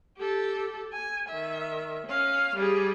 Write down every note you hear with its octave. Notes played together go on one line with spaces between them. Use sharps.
G4 A4
G#5
D#3 E5
C#4 F5
G3 G#4